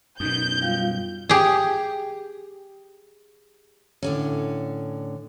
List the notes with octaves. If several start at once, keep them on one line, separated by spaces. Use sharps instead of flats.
F#2 B2 D#4 G6
G3 F4 F5
G4 G#4
A2 D3 C#4